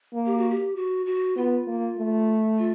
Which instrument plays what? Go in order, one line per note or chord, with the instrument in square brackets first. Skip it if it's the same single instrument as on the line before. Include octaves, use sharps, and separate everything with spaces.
[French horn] A#3
[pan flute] G4
F#4
G4
F#4
F#4
[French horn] B3 [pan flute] F4
[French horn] A#3
A3
[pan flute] F4